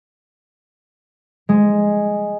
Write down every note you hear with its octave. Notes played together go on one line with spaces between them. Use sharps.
G#3